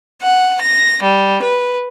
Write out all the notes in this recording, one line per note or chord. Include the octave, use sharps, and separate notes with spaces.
F#5
A#6
G3
B4